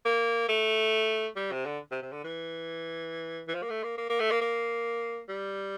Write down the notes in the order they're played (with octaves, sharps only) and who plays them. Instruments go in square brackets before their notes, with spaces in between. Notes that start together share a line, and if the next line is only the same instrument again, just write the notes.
[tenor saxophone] A#3
A3
G3
C3
D3
C3
C3
D3
E3
E3
F3
A#3
A3
A#3
A#3
A#3
A3
A#3
A#3
G3